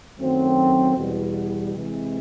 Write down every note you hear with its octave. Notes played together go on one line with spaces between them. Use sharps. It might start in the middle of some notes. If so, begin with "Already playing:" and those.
F#2 D#3 F#3 A3 C4
E2 B2 G3
C3 E3 G#3